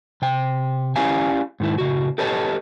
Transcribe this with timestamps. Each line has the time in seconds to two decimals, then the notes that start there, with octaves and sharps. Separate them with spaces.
0.22 C3 G5
0.96 C#4 E4 G4 D5 F5 G#5
1.60 G#2 D#3 E4
1.78 A2 C#3 F#4
2.18 G4 A4 B4 C#5 D#5 A5